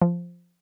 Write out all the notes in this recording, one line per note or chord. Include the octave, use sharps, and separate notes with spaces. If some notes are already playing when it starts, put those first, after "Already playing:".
F3